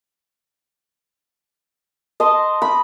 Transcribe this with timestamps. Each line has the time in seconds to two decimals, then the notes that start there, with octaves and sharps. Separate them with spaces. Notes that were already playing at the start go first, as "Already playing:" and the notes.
2.20 D#5 A5 C6
2.62 B5